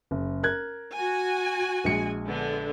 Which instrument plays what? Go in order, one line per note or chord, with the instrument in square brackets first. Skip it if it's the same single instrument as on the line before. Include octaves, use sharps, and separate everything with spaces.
[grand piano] F#1
A#4 F#6 G#6
[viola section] F#4 G#5
[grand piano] A#1 G#3 C#7
[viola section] D3 B3